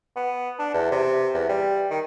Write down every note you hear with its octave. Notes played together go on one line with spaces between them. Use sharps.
B3
D4
E2
C3
E2
G3
D#3